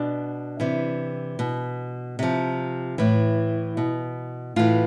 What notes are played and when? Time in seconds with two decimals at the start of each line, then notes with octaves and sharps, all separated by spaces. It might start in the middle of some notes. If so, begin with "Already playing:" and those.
Already playing: B2 D4
0.60 C3 E3
1.39 B2
2.19 C3 F3
2.98 A2 E3
3.77 B2
4.56 A2 E3 F4